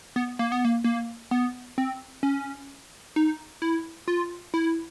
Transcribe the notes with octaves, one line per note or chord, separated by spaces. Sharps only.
B3
A#3
B3
A#3
A#3
B3
C4
C#4
D#4
E4
F4
E4